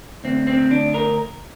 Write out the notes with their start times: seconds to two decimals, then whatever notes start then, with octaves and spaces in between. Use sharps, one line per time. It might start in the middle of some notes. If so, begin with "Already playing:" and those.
0.24 D2 C4
0.47 C4
0.71 D2 D4
0.94 A#4